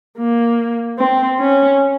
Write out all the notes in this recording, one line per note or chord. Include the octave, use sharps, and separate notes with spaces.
A#3
C4
C#4